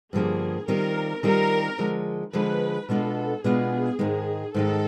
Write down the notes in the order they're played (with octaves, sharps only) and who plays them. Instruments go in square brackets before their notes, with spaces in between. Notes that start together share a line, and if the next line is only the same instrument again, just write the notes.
[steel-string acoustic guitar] G2 D3 F3 A#3 [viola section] G#4
[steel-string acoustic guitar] D#3 G3 C4 F4 [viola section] A#4
[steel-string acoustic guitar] D#3 G3 C4 F4 [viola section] A#4
[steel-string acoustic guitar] D3 F3 G#3
[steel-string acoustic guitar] D3 F3 G#3 [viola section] B4
[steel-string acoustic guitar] B2 G#3 B3 D4 F4 [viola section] A4
[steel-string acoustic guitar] B2 G#3 B3 D4 F4 [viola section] G#4
[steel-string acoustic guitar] G#2 D#3 G#3
[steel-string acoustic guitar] G#2 D#3 G#3 [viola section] A4